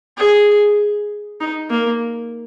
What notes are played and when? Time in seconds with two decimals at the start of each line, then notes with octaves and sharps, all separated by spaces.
0.18 G#4
1.41 D#4
1.70 A#3